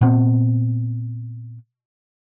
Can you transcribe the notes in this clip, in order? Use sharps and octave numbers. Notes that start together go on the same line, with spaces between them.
A#2 B3 C4